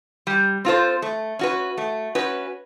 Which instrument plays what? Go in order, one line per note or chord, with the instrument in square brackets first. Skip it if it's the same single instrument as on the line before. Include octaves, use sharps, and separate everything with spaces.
[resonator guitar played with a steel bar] G3
C4 F4 A4 C5
A3
C#4 F#4 B4
A3
C#4 F#4 B4